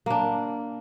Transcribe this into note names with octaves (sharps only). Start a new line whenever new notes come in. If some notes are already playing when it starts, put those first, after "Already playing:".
A#3 D4